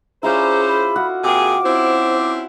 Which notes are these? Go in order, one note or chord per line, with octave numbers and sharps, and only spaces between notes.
C#4 E4 F4 G#4 C5 D5 A#5
B5
F4 F#4 F#5
C3 A#3 G#4 G5 D6
C4 C#4 E4 C5